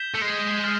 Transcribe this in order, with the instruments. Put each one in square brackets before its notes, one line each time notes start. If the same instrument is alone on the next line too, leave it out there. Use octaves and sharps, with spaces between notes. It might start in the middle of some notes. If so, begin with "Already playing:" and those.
Already playing: [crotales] G6 B6 E7 G7
[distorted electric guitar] A3
G#3
[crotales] F6 A6 C7